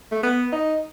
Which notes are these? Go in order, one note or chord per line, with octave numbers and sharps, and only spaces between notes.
A3
B3
D#4